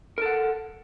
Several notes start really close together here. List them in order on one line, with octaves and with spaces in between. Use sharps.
A#4 A4 F#5